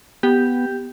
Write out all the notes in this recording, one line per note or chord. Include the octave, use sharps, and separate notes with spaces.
B3 G4